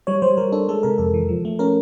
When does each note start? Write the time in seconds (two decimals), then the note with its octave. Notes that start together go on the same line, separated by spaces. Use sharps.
0.07 G3 C#5
0.22 G3 C5
0.37 G3 A#4
0.52 D4 A4
0.69 G#3 A4
0.83 C3 A#4
0.98 F2 A4
1.14 E3
1.29 F3
1.45 A3
1.59 C#4 A#4